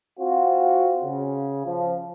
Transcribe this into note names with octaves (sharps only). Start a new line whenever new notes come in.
C4 F4 F#4
C#3
F3